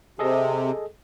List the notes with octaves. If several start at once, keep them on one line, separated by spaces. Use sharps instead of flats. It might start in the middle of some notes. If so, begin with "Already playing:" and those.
C3 G#4 A4 D#5